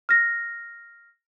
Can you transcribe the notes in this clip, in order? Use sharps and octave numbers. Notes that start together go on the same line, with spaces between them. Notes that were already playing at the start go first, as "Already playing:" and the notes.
F6 A#6